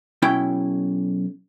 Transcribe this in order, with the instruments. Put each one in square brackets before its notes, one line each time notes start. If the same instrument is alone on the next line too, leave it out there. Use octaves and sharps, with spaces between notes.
[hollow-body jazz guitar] B1 C#4 E4 G5